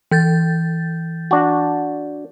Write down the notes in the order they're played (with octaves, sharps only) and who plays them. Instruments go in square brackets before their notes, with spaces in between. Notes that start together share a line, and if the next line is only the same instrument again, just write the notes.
[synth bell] E3 G6 A6
[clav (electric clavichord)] D4 F#4